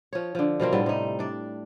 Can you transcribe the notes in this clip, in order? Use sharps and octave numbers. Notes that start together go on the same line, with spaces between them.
F3 C#5
D3 F3
B2 F3 A#3 C4
A2 G3 B3
C3 D#4
D4 D5